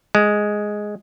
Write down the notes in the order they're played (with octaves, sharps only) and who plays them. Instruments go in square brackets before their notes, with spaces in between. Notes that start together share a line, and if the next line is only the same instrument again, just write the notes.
[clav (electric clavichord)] G#3